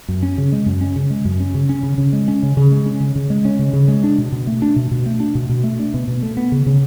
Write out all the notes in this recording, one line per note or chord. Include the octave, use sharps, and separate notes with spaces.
F#2
C#4
C#3
G#3
F#2
C#4
C#3
G#3
F#2
C#4
C#3
C#4
C#3
C#3
G#3
C#4
C#3
C#3
G#3
C#4
C#3
C#3
G#3
C#4
C#3
C#3
G#3
D4
B2
B2
A3
D4
B2
B2
A3
D4
B2
B2
A3
D4
B2
B2
A3
B3
C#3
C#3